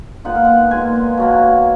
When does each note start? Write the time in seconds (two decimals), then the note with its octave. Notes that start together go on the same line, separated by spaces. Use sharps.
0.24 A#2 G#3 B3 D#4 F#5
0.35 F5
0.45 F#5
0.71 A#2 G#3 B3 D#4 G#5
1.17 B2 F#3 A#3